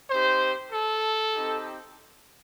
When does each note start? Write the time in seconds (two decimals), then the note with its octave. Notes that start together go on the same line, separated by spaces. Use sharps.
0.10 C4 D#4 G4 C5
0.72 A4
1.34 C4 D#4 G4